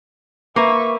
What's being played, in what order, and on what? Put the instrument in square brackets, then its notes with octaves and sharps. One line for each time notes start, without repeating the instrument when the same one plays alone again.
[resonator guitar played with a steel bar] A#3 B4 [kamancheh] E5 C#6